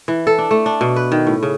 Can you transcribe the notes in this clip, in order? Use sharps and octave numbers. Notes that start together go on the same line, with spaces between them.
E3
A4
D4
A3
D4
B2
B4
D#3
A2
C#3